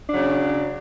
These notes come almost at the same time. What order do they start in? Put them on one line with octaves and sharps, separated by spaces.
D4 F#3 C#3